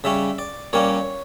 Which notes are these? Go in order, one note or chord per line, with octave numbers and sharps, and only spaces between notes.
C#3 G3 C#4 E5
D5
A#2 G3 A#3 C#4 C#5